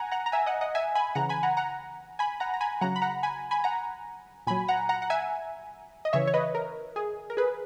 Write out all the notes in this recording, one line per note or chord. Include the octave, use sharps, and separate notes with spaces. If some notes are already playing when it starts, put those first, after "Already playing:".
Already playing: F#5 G#5 A#5
F#5 A#5
A#5
E5 G#5
D#5 F#5
D#5 F#5
E5 G#5
G#5 B5
C#3 E3 F#5 A#5
G#5 B5
F#5 A#5
F#5 A#5
G#5 B5
F#5 A#5
A#5
G#5 B5
C#3 F#3 F#5 A#5
B5
F#5 A#5
G#5 B5
G#5 B5
F#5 A#5
A#2 F#3 G#5 B5
F#5 A#5
F#5 A#5
F#5
E5 G#5
D#5
C#3 E3 C#5 E5
C#5
B4 D#5
A#4
G#4
A#4
G#4 B4